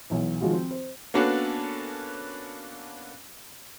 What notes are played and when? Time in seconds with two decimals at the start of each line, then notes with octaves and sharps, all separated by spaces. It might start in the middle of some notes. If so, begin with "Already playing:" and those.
0.10 B1 E3
0.41 D#3 F3 G#3 F4 F#4
0.53 C4
0.71 C5
1.14 A#3 B3 C#4 D4 F#4 A4